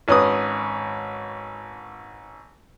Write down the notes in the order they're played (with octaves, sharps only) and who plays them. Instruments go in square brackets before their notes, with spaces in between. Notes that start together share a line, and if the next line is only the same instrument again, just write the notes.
[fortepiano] G#1 C#4 B4 D#6